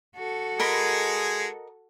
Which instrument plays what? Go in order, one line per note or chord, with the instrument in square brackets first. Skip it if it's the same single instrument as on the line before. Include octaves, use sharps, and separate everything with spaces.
[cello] F#4 A4
[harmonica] G#3 G#4 [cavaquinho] A#4 D#5 B5